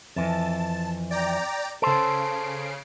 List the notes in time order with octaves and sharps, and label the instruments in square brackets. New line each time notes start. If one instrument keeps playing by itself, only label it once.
[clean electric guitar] F2 E3 [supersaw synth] A5
[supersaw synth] D5 G5 A#5
[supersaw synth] C#3 C7 D7 [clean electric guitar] A4 C5